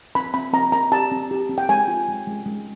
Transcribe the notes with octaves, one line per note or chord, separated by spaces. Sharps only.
C4 B5
C4 B5
C4 A#5
C4 A#5
G4 A5
C4
G4
C4
G5
G#3 G#5
F4
G#3
G#3
G#3